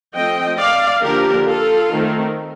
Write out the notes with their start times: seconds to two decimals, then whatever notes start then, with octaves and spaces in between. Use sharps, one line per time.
0.15 F3 A3 C4 D#5 G5
0.59 D5 F5
1.03 D3 F3 A#3 D4 G4 A#4
1.48 F4 A4
1.92 D#3 A3 C4